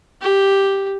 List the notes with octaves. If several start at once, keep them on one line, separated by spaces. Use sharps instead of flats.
G4